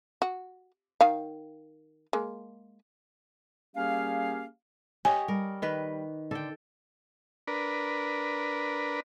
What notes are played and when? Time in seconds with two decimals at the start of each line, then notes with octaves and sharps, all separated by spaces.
0.22 F#4
1.01 D#3 F5
2.13 G#3 A#3
3.76 G3 A#3 C#4 G4 G#4 F5
5.05 G4 C#5 D#5 G#5
5.28 G3 A#4
5.62 D#3 B4
6.31 D3 A4 G5
7.48 D4 A#4 B4